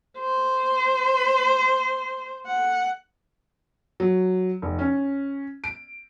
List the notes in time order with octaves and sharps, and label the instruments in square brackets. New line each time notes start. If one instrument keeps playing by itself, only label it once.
[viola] C5
F#5
[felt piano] F#3
F1
C#4
D7